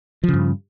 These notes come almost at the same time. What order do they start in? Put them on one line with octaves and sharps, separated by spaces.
F3 C#3 G2